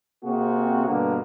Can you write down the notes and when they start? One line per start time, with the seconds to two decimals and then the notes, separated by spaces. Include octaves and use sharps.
0.24 C3 A#3 C4 F#4 G#4
0.85 G2 B2 D3 A#3 B3